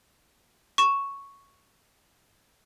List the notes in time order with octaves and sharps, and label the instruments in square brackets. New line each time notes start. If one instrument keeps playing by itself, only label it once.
[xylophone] C#6 E7